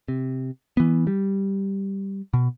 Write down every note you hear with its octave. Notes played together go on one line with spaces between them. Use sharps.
C3
E3 B3
G3
B2